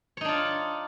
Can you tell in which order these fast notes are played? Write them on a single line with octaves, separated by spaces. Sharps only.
C#5 D#4 D4 F4